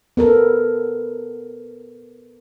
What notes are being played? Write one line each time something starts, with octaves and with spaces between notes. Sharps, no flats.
B3 A4 A#4